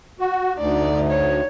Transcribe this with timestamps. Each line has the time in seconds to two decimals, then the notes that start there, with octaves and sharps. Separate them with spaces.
0.19 F#4
0.58 D2 D#4 D5
1.10 C#5